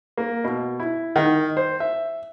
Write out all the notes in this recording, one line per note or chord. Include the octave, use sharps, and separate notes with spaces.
A#3
B2
E4
D#3
C5
E5